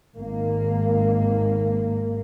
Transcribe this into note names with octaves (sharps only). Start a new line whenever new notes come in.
G#1 A#3